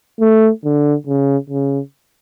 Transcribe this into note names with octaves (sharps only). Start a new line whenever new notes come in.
A3
D3
C#3
C#3